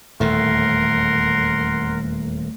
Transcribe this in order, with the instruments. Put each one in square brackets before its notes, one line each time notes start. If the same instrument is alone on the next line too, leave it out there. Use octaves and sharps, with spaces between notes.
[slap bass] D#1 E2 A2 [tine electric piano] A3 [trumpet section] A#4 F#5 C6